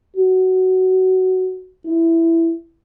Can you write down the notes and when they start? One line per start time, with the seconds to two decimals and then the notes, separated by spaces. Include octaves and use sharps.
0.16 F#4
1.86 E4